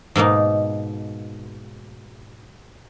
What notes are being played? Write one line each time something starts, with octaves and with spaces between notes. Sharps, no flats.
G#2 B2 A#3 D#4